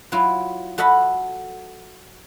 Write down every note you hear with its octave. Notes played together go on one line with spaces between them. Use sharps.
F#3 E4 F4
F#4 A4 D#5 F#5 B5